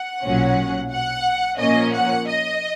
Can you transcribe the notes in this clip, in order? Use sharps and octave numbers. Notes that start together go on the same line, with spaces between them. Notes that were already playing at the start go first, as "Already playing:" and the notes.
Already playing: F#5
B1 A#2 F#3 C#4
F#5
A#2 F3 A#3 C#4 D#5
F#5
D#5